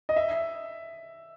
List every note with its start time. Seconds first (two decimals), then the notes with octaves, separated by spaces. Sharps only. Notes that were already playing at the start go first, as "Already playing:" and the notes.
0.09 D#5
0.16 E5